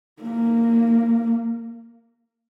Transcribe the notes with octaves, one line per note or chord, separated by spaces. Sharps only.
A#3